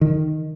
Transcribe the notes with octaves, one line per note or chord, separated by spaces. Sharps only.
D#3